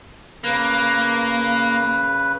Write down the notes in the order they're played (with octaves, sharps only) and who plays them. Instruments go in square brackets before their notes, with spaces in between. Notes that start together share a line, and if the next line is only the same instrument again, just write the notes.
[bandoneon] C#3 B4 [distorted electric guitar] A#3